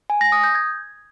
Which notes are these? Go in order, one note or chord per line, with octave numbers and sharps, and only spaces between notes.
G#5
A#6
D#6
G6
G#6